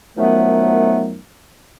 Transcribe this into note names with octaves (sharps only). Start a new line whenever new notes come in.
F#2 D#3 F3 F#3 A3 B3